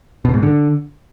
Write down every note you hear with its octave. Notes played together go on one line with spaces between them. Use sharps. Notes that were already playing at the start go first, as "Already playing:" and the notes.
B2
G#2
D3